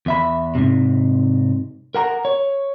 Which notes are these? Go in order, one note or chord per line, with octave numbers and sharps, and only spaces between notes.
E2 E5 B5
G#2 C3
A#4 F#5 A#5
C#5